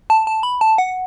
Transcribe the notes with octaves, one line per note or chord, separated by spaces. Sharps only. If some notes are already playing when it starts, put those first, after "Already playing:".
A5
A5
B5
A5
F#5